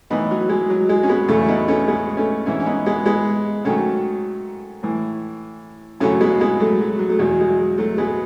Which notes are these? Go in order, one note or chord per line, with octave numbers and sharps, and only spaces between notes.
A2 E3 B3 D#4
F#3
G#3
F#3
G#3
C#4
G#3 B3
E2 C#3 F#3 A3 C#4
E4
B3 D#4
A3 C#4
G#3 B3
A3 C#4
G#2 E3 C#4 E4
C#4
B3 D#4
G#3 B3
G#3 B3
G#2 D#3 F#3 A3 C#4
A2 E3
F#2 C#3 F#3 A3 C#4
G#3 B3
G#3 B3
F#3 A3
F#3
F#3
A3
E2 B2 F#3 G#3
G#3
F#3
F#3 A3
G#3 B3